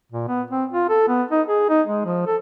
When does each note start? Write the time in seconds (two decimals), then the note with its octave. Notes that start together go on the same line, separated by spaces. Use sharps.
0.12 A#2
0.28 B3
0.51 C4
0.73 F4
0.89 A4
1.08 B3
1.31 D#4
1.48 G#4
1.69 D#4
1.87 G#3
2.05 F3
2.26 A4